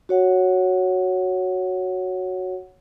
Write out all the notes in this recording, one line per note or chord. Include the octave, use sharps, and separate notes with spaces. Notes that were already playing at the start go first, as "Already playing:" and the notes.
F#4 C#5 F#5